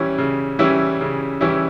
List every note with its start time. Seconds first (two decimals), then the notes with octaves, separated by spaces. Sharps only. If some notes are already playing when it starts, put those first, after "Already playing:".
Already playing: E3 G3 C#4 E4
0.18 C#3
0.59 E3 G3 C#4 E4
1.01 C#3
1.41 E3 G3 C#4 E4